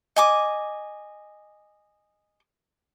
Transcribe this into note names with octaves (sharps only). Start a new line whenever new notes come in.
D#5 G#5 D6